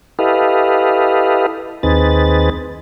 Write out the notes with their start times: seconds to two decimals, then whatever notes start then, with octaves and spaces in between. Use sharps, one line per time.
0.19 E4 G4 A4 B4 D#5 F5
1.83 D#2 C4 D#4 G#4 B4 A6